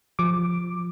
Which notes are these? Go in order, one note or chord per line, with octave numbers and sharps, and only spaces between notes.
F3 D6